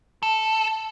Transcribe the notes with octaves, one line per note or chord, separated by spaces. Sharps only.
A4